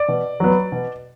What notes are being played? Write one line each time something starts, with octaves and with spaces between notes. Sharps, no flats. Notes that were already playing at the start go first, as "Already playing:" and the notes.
Already playing: D5
B2
F#3 B3
B2